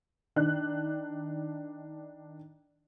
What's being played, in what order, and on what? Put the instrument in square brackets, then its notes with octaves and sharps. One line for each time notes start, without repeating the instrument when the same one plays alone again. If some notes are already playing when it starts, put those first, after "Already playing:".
[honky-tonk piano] D#3 D4 F#6